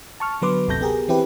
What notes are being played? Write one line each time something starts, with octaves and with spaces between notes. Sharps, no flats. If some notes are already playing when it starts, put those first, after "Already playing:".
A5 C#6 F6
D3 F#3 B3 B4 C6 D6
G1 D2 C3 A4 G6 A#6
B3 G4 G#4 A#4
E3 C4 E4 G4 B4